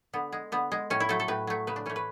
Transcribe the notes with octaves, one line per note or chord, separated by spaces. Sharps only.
D3 B3
G#3
D3 B3
G#3
A2 C#4
E4
F#3 A3 A4
A4
A2 B4
F#3 A3
C#3 B4
D4
E3 A3 C#4
B4